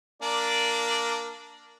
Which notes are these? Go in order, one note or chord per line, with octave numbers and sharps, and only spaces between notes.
A#3 D4 D5